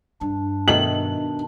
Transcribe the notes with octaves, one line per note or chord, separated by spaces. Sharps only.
G2 D4
B2 D#3 A3 F#7